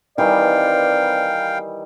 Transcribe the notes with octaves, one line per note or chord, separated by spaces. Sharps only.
D#3 E3 G3 C4 B4 D5 F5 G5